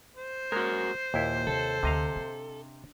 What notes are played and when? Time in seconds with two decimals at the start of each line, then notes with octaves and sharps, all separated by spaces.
0.16 C5
0.52 G#3 A#3 F#4 A#4
1.14 D#2 A#2 E4 E5
1.47 C3 A4
1.83 D2 C3 D#5 F5
2.16 D4